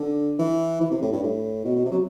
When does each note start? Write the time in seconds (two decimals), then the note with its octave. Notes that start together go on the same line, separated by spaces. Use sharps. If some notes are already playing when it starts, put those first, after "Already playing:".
Already playing: D3
0.39 E3
0.81 E3
0.91 C3
1.02 A2
1.12 G2
1.23 A2
1.65 B2
1.76 B2
1.86 C3
1.92 F#3